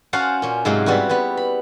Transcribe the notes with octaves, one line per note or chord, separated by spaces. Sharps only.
C#4 F#4 C5 F5 F#5 A5
A#2 C#4
G#2 C3 F#3 G#3 F4
G3 B3 C4 E4 F#4
G3 B3
B5